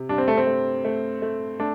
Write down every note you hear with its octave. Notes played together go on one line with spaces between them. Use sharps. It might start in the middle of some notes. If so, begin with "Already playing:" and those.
Already playing: C3
G2 D4
C4
A3
C4
A3
A3
A3
A3 D4